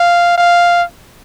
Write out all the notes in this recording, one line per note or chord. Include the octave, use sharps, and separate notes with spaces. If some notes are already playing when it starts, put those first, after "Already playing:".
Already playing: F5
F5